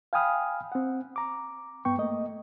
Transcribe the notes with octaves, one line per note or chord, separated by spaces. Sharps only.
F5 G5 G#5 B5 D#6 F6
C4 F#5
A#5 D6
G2 B3 G5 C#6
A3 A#3 D#5